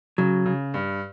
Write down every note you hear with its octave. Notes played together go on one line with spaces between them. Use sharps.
C#3 F#3
C#3
G2